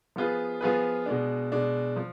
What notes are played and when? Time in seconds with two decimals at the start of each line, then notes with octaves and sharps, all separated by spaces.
0.16 F3 B3 F4 G#4 B4
0.61 F3 B3 F4 G#4 B4
1.06 B2 G#3 D4
1.52 B2 G#3 D4
1.96 F3